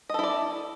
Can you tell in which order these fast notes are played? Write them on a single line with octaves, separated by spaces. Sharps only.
D#5 A4 E4 D5